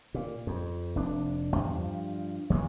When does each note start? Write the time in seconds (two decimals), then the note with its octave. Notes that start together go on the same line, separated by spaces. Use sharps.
0.14 A#2
0.47 F2
0.96 F1 D4
1.55 E2 G2
1.71 G2 F3
2.50 E2 A#2 C#3 E3